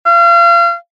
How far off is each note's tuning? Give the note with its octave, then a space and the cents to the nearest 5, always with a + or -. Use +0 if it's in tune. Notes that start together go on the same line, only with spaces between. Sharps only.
F5 -35